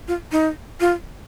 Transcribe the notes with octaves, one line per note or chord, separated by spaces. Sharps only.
F4
D#4
F4